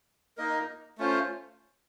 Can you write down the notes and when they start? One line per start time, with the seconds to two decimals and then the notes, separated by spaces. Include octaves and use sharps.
0.37 A#3 D#4 A#4 D#5
0.98 A3 C#4 F4 C5